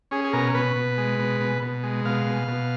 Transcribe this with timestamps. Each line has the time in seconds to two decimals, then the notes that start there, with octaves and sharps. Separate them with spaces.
0.11 C#4 G#4
0.24 G#4
0.33 B2 A#4
0.55 B2 B4
0.76 B2
0.98 G#3
1.19 B2
1.40 B2
1.62 B2
1.83 G#3
2.05 B2 F5
2.26 B2
2.48 B2